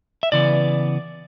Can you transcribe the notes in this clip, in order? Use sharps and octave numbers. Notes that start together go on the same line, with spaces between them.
E5
C#3 E3 B3 D5